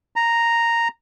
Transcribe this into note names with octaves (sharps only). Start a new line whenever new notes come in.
A#5